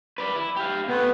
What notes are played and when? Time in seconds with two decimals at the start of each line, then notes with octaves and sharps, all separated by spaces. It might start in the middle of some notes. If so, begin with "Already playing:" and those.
0.18 B4 D5
0.36 E4
0.56 G4 F5
0.88 C3 A3 B3